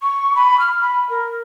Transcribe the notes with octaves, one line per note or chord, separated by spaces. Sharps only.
C#6
B5
F6
B5
A#4